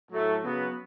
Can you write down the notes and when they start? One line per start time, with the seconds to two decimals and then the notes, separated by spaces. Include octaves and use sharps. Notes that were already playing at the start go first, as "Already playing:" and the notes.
0.10 A2 F#3 A3
0.43 C#3 F#3 B3